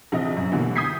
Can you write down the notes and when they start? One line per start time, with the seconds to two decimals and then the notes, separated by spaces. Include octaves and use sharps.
0.12 A#1 C3 E3 C4 D#5
0.37 F#2
0.52 B2 D3 E3 F#3 G3 A#3
0.76 D#6 G6 G#6 B6 C7